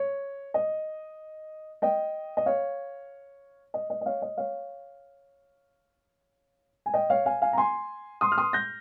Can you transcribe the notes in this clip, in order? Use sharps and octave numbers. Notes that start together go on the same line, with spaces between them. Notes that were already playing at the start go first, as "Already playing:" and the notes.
Already playing: C#5
D#5
D#5 G5
D#5
C#5 F5
D#5
D#5
D#5
C#5 F5
D#5
C#5 F5
G#5
D#5 G5
C#5 F5
F5 G#5
F5 G#5
A#5
G#5 C6
C6 D#6
F6
C6 D#6
G6 A#6